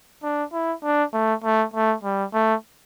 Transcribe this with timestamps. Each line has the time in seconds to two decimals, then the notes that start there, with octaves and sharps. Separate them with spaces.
0.23 D4
0.53 E4
0.83 D4
1.13 A3
1.44 A3
1.74 A3
2.04 G3
2.33 A3